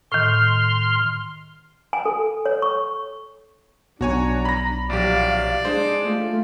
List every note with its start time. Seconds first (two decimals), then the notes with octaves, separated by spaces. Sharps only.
0.12 A2 D#3 C6 F6
1.93 G#5
2.06 A4
2.46 C#5
2.62 C#6
4.01 B1 D4 F#4 C#5 G#5 A#5
4.45 B5 A#6
4.90 A#1 F#3 G4 D5 F5
5.65 G#3 D4 C5
6.04 A3 F4